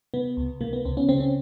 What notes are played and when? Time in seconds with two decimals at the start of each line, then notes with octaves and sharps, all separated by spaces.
0.14 C3 B3
0.37 C#2
0.61 C3 A#3
0.73 B3
0.85 C#2 C4
0.97 B3 C#4
1.09 C#3 C4
1.20 C#4